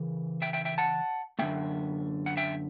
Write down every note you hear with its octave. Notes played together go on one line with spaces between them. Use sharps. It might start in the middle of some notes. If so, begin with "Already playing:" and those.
Already playing: C#3 E3
E5 G5
E5 G5
E5 G5
F#5 A5
F#2 D3 A3 E5 G5
F#5
E5 G5